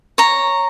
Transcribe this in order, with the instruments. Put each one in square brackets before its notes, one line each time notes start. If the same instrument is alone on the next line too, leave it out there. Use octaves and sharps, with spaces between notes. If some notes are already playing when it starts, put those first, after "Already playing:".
[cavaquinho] C#5 A#5